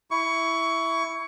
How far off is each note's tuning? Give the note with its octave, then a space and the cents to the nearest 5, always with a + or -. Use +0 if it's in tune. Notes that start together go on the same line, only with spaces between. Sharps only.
E4 +0 C#6 +20